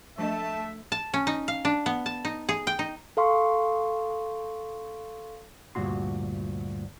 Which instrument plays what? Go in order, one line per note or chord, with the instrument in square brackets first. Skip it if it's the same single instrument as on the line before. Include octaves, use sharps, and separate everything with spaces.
[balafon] F3 D4 D#5 [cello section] A3 [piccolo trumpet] E5 [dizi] A5
[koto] A5
C#4
D#4
F5
D4
B3
A5
D#4
G#4
G5
D#4
[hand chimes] A4 F5 C6 C#6
[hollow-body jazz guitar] D2 G2 A#2 F#4 C6